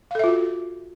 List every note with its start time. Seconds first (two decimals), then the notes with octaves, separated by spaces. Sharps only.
0.11 F5
0.15 A4
0.19 E5
0.24 F4
0.28 F#4